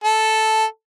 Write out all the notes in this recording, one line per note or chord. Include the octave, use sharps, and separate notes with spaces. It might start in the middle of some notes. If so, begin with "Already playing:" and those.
A4